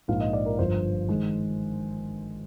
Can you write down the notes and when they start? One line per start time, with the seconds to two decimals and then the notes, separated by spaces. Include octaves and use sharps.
0.08 A#1 G#2 F3 A#3 D#4 F5
0.21 D#5
0.33 D5
0.46 A#4
0.59 G1 G2 F3 C5
1.09 D#3 G#3